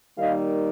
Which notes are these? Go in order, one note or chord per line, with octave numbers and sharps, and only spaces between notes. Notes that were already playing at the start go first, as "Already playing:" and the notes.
D#3 G3 A#3 D#4 D#5 F5